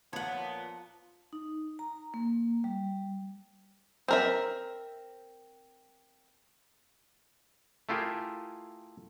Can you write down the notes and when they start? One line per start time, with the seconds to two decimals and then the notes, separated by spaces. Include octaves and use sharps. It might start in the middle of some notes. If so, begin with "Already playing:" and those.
0.13 A#2 F3 B3 C#5 F#5
1.33 D#4
1.79 A#5
2.14 A#3
2.64 G3
4.08 C4 A#4 E5
7.89 A3 E4 F4 G4 G#4 A#4